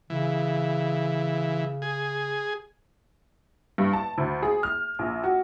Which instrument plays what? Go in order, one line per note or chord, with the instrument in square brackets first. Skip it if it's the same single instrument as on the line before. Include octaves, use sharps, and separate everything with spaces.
[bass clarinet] C#3 [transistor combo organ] E3
[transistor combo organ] G#4
[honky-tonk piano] G2
A5
D2
G#4
F6
A#1
F#4